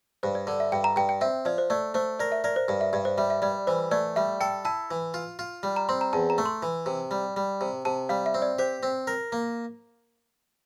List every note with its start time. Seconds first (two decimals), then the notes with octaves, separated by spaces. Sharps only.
0.23 G2 C5
0.35 D5
0.47 D3 D5
0.60 E5
0.72 G2 G5
0.84 A#5
0.96 G2 G5
1.09 G5
1.21 C4 E5
1.45 F3 D5
1.58 C5
1.70 A3 D5
1.94 A3 C5
2.19 A#4 D5
2.32 E5
2.44 A#4 D5
2.56 C5
2.68 G2 D5
2.81 E5
2.93 G2 D5
3.05 C5
3.18 G3 E5
3.30 E5
3.42 G3 D5
3.67 E3 C5
3.91 A3 D5
4.16 G3 E5
4.41 A4 G5
4.65 E4 A5
4.91 E3
5.14 F4
5.39 F4
5.63 G3
5.76 A#5
5.89 C4 C6
6.01 A#5
6.13 E2 A5
6.30 A#5
6.38 A3
6.46 C6
6.62 E3
6.86 C3
7.11 G3
7.36 G3
7.61 C3
7.85 C3 A5
8.09 G3 F5
8.26 E5
8.34 C4
8.42 D5
8.59 G4 C5
8.83 C4
9.07 A#4
9.32 A#3